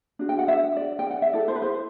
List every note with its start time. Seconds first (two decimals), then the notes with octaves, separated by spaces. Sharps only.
0.19 D4 F#4
0.29 G5
0.39 F#5
0.48 E5
0.76 D5
0.99 G5
1.11 F#5
1.22 E5
1.33 E4 A4 D5
1.48 C5
1.55 B4
1.62 C5